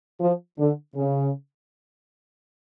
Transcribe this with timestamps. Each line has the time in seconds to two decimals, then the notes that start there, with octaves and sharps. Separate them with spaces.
0.20 F3
0.58 D3
0.96 C#3